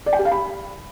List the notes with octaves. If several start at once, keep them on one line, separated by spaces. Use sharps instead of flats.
D5
G5
G4
F5
B5